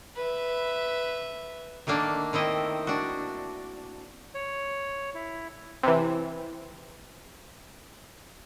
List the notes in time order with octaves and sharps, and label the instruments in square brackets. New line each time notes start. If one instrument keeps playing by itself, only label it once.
[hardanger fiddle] B4 E5
[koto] D#3 A3 A#3 D4
D#3 C4 E4 D#5
D4 F#4
[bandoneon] C#5
E4
[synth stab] C3 E3